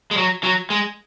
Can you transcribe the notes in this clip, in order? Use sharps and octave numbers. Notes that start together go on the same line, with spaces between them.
G#3
F#3
F#3
G#3